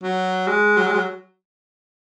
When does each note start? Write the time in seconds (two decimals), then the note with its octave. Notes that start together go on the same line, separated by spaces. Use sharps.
0.03 F#3
0.48 G#3
0.77 F#3
0.87 G#3
0.95 F#3